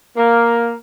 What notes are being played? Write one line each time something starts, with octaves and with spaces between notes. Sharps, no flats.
A#3